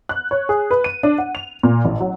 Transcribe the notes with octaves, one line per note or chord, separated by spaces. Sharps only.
F#6
C#5
G#4
B4
D#7
D4
F#5
F7
A#2
A1
F#3